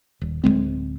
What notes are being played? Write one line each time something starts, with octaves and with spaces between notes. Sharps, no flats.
D#1
D1 E2 G#3 C4